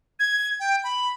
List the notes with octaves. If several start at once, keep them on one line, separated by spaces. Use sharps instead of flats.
G#6
G5
B5